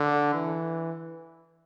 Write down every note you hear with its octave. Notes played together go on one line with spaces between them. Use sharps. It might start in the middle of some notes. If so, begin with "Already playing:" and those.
Already playing: D3
E3